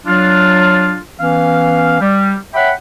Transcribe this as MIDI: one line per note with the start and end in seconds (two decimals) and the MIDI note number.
0.06 0.97 54
0.06 0.97 62
0.06 0.97 65
1.20 2.00 52
1.20 2.00 59
1.20 2.00 61
1.20 2.00 77
2.01 2.34 55
2.55 2.71 73
2.55 2.71 76
2.55 2.71 78
2.55 2.71 79
2.55 2.71 83